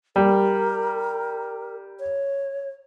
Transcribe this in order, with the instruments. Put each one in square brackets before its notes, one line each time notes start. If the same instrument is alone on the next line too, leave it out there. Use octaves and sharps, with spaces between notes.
[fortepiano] G3 [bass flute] A#4
[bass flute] C#5